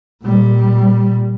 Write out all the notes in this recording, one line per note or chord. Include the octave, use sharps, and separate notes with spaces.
A#2 G3